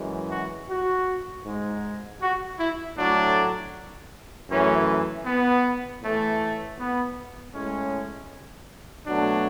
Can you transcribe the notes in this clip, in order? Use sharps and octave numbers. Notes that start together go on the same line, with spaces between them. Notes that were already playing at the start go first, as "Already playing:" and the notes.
Already playing: F#2 E3 G#3
F#4
F#4
G#2 G#3
F#4
E4
A2 F#3 A3 D4
F#2 E3 A3 C#4
B3
A2 E3 A3
B3
A2 G#3 C#4
B2 F#3 A3 D4